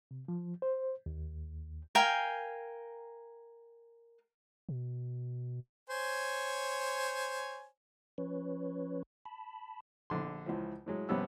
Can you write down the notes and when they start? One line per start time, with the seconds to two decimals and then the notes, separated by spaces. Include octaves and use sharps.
0.11 C3
0.28 F3
0.62 C5
1.06 D#2
1.95 A#4 F5 G5 G#5
4.69 B2
5.90 C5 C#5 G#5
8.18 F3 C#4 B4 C#5
9.26 A5 B5
10.10 A#1 D3 C6
10.46 C#2 E3 F3
10.86 A2 F#3 G#3
11.09 A#1 G2 C3 B3 C#4 E6